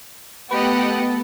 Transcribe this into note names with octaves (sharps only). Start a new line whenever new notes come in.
A3 B3 G4 A4 B4 D#5 F#5